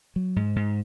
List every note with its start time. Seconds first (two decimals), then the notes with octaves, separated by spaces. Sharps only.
0.16 F#3
0.36 G#2
0.56 G#2